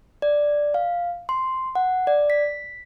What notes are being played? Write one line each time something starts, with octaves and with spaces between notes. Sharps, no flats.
D5
F5
C6
F#5
D5
B6